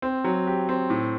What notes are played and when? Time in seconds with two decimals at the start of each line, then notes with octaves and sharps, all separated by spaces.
0.02 C4
0.24 F#3
0.47 G4
0.69 C4
0.90 A2